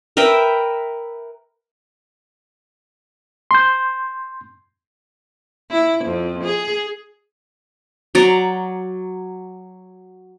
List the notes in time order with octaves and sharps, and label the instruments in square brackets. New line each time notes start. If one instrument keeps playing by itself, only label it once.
[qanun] A#4 B4 E5 G5
[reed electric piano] C6 G6
[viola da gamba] E4
F2
G#4
[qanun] F#3 D5 A#5